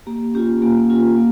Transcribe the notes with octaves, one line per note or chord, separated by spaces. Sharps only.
A#3 G4
C#4 F4 G4
A#3 G4
C#4 F4
A#3